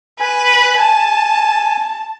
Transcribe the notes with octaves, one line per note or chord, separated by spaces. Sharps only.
B4 G#5
A5